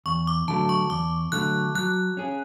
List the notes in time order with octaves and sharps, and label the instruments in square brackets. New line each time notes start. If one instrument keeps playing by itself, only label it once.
[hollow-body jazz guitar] E2 [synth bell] C#6
[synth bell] D6
[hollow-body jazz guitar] D3 F#3 A3 [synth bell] A5
[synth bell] C#6
[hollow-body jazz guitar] E2 [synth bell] D6
[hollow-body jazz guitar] D3 F#3 A3 [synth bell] F#6
[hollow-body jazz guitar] F#3 [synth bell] F#6
[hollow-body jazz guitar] C#4 G#4